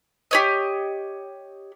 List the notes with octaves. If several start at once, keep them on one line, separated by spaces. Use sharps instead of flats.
G4 C#5 D#5